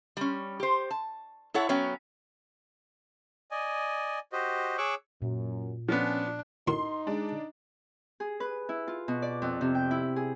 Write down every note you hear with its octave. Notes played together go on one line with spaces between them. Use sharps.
G3 C#4
G4 C5
A5
E4 A4 C#5 F#5
F#3 B3 C#4 C#5 G5
D5 D#5 G#5
F#4 G4 C5 D#5
G#4 C#5 C#6 D6 E6 F#6
F#2 A#2
F3 B3 C#4 D4
A2 D#4 F#4 A#4 C6
G#3 D4
G#4
B4
E4
F4
B2
D5
F2
C3
G5
E4
G#4